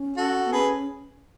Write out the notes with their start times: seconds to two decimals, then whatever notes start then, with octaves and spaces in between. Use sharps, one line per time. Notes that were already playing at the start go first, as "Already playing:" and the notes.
Already playing: C#4
0.17 F#4 A4
0.46 B3
0.52 C#4 G#4 B4